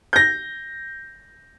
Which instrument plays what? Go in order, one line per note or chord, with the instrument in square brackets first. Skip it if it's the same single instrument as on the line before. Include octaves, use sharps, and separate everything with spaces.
[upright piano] G6 A#6